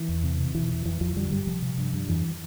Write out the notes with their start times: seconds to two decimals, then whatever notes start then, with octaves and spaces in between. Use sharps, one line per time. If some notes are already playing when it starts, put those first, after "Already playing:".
Already playing: E3
0.09 E2
0.24 C3
0.39 C3
0.55 B2 E3
0.70 E2
0.85 F2 E3
1.01 F2 F3
1.16 D3 G3
1.32 G2 G3
1.47 C3 F3
1.62 C3
1.78 G2
1.93 G2
2.08 F2 E3